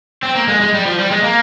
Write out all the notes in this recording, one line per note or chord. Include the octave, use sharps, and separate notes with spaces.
C4
A#3
G#3
G#3
G3
F3
G3
G#3
A#3